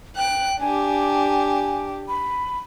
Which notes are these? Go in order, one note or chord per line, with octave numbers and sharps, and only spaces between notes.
G5 F#6
D4 G4 G#5
B5